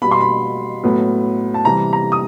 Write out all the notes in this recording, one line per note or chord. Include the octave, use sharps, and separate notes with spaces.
B2 G3 B3 B5
C6
B5
A2 F#3 B3
A5
C3 E3 G3 A#5
A#5
D#6